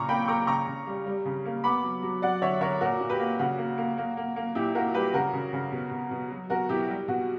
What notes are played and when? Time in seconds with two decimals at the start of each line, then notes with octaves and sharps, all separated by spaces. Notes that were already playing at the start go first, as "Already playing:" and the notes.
Already playing: A#2 C#3 A#5 C#6
0.09 A#3 G5 B5
0.28 A#3 A#5 C#6
0.47 C#3 A#5 C#6
0.67 C#3
0.87 G3
1.06 G3
1.25 C#3
1.45 A#3
1.64 B3 B5 D6
1.83 F#3
2.02 F#3
2.22 F#3 D5 F#5
2.42 D3 C#5 E5
2.61 D3 A#4 C#5
2.81 A#2 F#4 A#4
3.00 A#2
3.09 G4 B4
3.20 A#3
3.39 C#3 F#4
3.58 A#3
3.78 A#3
3.98 A#3
4.17 A#3
4.36 A#3
4.55 A#2 E4 G4
4.75 A#3 F#4 A#4
4.94 G3 G4 B4
5.14 C#3 F#4 A#4
5.33 C#3
5.53 C#3
5.72 B2
5.91 B2
6.11 B2
6.31 F#3
6.50 B2 F#4 A#4
6.69 B2 E4 G4
6.89 G3
7.08 B2 F#4